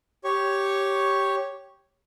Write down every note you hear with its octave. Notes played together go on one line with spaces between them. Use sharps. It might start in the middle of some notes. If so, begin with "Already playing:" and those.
G4 C#5 C#6